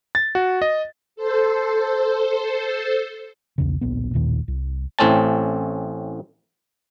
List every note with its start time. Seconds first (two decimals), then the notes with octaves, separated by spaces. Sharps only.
0.15 A6
0.35 F#4
0.62 D#5
1.16 A4 C5
3.58 B1 E2 C#3
3.81 D1 A#1 B3
4.14 A1 D#2 A#2 D#3
4.48 C2
4.99 A1 A2 C4 C#4 A5